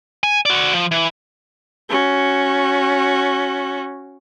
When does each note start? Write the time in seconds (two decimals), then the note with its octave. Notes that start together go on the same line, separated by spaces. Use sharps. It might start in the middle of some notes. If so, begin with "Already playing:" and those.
0.23 G#5
0.45 F#4 D5
0.73 F3
0.91 E3
1.90 C#4 F#4